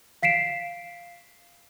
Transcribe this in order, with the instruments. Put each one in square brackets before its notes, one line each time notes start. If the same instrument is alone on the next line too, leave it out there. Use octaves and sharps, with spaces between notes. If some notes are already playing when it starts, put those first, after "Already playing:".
[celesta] F5 B6 C7 D7 E7